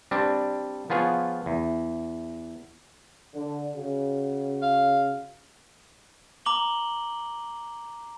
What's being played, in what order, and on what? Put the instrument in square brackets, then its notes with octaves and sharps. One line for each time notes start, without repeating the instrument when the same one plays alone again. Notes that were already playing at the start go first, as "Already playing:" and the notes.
[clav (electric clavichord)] G3 C4 D4
F3 B3 F4 G#4 C#5
E2
[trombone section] D3
C#3 F#4
[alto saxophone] F5
[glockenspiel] A#5 D6 F#7 G7